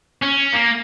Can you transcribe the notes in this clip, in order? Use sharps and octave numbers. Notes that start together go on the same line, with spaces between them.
C#4
A#3